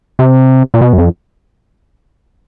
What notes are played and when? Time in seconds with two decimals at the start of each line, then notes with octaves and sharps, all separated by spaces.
0.19 C3
0.74 A#2
0.81 B2
0.93 F#2
0.98 F2